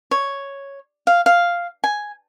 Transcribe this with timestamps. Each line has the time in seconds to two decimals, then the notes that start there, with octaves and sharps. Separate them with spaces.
0.11 C#5
1.07 F5
1.26 F5
1.84 G#5